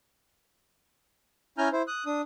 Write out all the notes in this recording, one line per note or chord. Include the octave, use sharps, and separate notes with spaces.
C#4 E4 G#5 A#5 F6 G6
E4 C5
D#6 F#6
D4 D#6